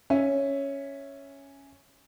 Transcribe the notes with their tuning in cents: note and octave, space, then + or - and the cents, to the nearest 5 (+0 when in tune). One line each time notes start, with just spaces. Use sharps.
C#4 +0 E5 +0